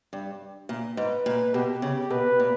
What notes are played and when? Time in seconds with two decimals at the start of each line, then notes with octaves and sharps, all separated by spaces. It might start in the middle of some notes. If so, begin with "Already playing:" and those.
0.13 G2
0.69 A#2
0.97 G#2 B4
1.26 A#2
1.54 B2 G4
1.82 C#3
2.10 B2 B4
2.40 A#2